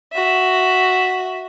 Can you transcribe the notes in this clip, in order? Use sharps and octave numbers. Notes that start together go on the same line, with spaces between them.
F#4 E5